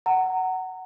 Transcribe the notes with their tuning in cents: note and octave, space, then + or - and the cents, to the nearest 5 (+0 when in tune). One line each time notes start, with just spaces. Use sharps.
F#5 +15 A#5 -25